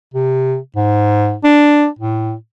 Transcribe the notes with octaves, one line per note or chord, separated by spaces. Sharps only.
C3
G#2
D4
A2